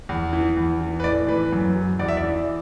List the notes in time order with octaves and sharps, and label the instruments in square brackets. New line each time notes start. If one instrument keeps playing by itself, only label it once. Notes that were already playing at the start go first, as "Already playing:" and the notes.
[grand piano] E2
E3
E2
E3
B4
A2 D5
E3 B4
F#2
F#3
E2 D5
E5
D5
E3